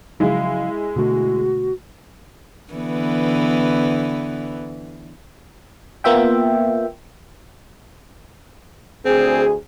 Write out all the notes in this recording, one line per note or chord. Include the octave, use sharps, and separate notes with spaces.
C#3 F3 F#3 G#3 E4 F5
B2 D3 A3 F#4
D3 E3 B3
A#3 B3 F4 E5 G5
D2 C4 G#4